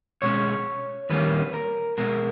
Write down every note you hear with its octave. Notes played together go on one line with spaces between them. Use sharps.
B2 G#3 C#4 C#5
D#2 D#3 G3 A#3 C#4 B4
A#4
B2 G#3 B3 A#4